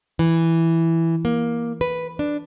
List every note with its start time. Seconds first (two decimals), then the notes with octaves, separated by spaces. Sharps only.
0.19 E3
1.25 A#3
1.81 B4
2.19 D4